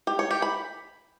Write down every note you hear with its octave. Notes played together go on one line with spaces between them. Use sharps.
G4
C#5
G4
B5